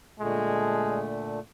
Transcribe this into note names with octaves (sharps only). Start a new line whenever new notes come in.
A#2 D3 G#3 A3